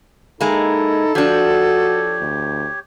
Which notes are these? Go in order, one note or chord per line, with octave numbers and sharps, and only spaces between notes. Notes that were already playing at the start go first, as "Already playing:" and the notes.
G#3 A#3 D#4 E4 A4 A#5
F3 D4 F#4 G4 C#5
D2